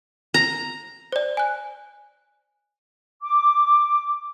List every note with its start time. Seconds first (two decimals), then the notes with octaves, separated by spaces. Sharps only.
0.34 A#5
1.12 C5 D5
1.37 G#5 F#6
3.22 D6